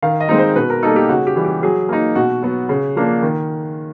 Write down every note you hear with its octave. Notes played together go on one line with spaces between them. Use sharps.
D#3 F5
D#5
G#3 C4 D#4
C5
B2 B4
A#4
G3 A#3 D#4 A4
G4
C#3 F#4
G4
E3 G3
G4
F#3 G#4
A#3 D#4
B2 F#4
F#3 B3
C#3
F3 A#3 D4
D#3